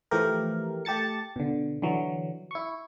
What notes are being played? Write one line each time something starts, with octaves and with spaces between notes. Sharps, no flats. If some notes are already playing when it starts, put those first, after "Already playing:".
E3 F3 A3 G4 A#4
A3 G4 A5 A6 C#7
B2 D3
D3 E3 F#3
E4 C#6